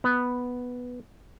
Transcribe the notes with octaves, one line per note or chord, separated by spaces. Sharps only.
B3